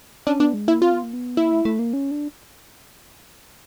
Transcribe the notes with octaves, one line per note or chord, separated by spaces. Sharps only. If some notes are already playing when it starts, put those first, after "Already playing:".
C#4 D4
B3 D4
G#3
A#3 E4
C4 F4
B3
A#3
B3
A#3 E4
A3
A3
A#3
C#4
D4